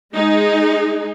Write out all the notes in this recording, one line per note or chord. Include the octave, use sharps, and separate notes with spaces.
G#3 D#4 G#4